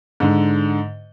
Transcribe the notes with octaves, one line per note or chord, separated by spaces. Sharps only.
G#2 D3